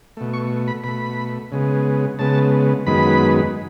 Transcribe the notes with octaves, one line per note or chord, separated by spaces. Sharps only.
B2 A3
C#6
B5
B2 A3 B5
C#3 G#3 B3
C#3 G#3 B3 A5
F#2 D#3 G#3 B3 B5